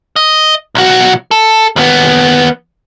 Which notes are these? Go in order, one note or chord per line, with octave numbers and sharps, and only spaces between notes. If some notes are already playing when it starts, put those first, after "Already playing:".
D#5
B1 F#4
A4
D#2 B3